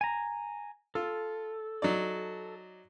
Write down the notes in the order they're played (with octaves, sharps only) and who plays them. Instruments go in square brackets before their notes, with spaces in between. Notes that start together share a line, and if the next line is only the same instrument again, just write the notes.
[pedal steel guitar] G#5 A#5
[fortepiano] F4 [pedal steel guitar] A4
[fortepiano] F#3 D#4 D5